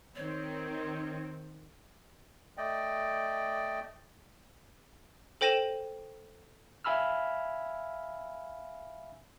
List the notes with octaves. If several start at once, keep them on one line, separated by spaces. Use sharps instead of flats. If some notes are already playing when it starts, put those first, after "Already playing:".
D#3 C4 C#5
A3 D5 D#5 G5
A4 C5 G5 A#6 D#7 E7
E5 F5 G#5 B5 E6 F6